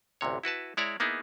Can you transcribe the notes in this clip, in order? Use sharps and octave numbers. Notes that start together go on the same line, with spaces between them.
A1 D2 C3 C#5
E4 F#4 B4 A5
G#3 E4 C#5 D5 A#5
A#3 B3 D#4 E4 G#4